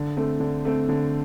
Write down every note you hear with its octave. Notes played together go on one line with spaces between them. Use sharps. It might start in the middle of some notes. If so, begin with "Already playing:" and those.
Already playing: D3
A3 C4
D3
A3 C4
D3